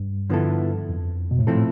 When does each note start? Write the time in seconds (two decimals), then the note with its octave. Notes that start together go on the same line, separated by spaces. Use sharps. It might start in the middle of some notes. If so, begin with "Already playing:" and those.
Already playing: G2
0.30 D3 F3 B3 E4 A4
0.89 F2
1.31 B2
1.39 A2
1.47 F3 A3 C4 E4 A4
1.55 A2